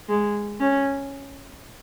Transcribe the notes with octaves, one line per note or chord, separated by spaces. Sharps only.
G#3
C#4